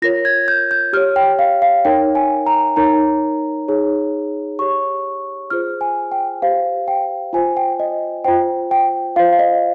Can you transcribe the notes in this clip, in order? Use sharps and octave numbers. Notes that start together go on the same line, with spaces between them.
F4 A#4 C#5 A#6
G#6
G6
G6
G4 C#5 F6
G5
F5
F5
D#4 A#4 C#5 G5
G#5
A#5
D#4 A#4 C#5 A#5
D#4 G#4 C#5
G4 C#5 C#6
F4 G#4 C5 F6
G#5
G5
G4 C5 F5
G5
F4 C5 G#5
G5
D#5
F4 C5 G5
G5
F4 C5 F5
F5
D#5